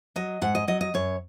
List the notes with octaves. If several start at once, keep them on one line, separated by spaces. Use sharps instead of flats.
F#3 D#5
G#2 F#5
D#5
F#3 D#5
D#5
F#2 C#5